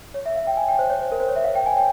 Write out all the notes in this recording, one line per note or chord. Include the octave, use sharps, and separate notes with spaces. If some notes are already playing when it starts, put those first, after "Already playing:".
C#5
E5
F5
G5
G#5
G5
C5
C#5
C5
A#4
C5
C#5
E5
F5
G5
G#5
G5